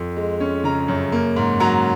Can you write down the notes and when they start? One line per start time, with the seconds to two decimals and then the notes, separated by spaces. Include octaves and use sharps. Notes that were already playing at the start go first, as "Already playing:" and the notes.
Already playing: F2
0.16 G#3
0.40 C#4
0.64 C#3 A#5
0.88 F#2
1.12 A#3
1.36 G#2
1.60 F#3 A#5